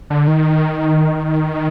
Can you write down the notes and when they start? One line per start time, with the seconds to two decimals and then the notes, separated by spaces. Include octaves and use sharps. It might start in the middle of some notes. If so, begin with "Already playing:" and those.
0.10 D3
0.27 D#3